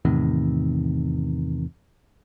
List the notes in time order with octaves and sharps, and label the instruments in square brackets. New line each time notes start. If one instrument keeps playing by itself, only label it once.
[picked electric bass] E2 A2 C3 D#3